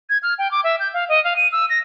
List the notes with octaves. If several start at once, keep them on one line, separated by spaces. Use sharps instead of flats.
G#6
F6
G5
D6
E5
G6
F5
D#5
F5
D#7
E6
A#6